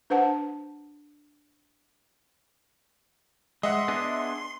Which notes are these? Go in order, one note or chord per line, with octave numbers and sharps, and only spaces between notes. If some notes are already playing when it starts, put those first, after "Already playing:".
D4 B4 C5 F#5 A5
G#3 D#5 E5 F#5 C6
B3 D4 G#4